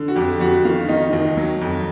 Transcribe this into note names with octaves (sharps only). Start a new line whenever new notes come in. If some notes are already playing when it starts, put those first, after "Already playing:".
Already playing: D3
F#4
F2 G4
F2 F#4
D#3 F4
D#3 D#4
D#2
F#3
F2